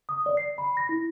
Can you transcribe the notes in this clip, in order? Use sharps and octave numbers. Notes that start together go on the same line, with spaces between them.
D#6
D5
C7
B5
A#6
E4